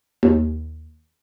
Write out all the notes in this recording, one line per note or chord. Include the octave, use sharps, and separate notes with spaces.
D#2